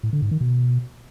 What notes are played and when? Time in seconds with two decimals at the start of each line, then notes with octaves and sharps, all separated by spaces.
0.03 A2
0.13 D3
0.22 G#2
0.31 D#3
0.41 B2